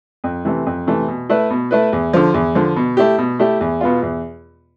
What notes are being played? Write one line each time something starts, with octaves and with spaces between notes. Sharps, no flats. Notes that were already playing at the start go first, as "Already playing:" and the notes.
F2
C3 E3 A3
F2
C3 E3 A3
B2
A3 E4 B4
B2
A3 E4 B4
E2
D3 F3
E2
D3 F3
B2
A3 E4 G4
B2
A3 E4 G4
E2
B2 B3 F4
E2